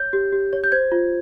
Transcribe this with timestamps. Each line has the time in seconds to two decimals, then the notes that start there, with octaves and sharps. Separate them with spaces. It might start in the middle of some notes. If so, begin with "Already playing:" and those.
Already playing: C#5 G6
0.13 G4
0.32 G4
0.53 C#5
0.64 G6
0.72 C5 G#6
0.92 F4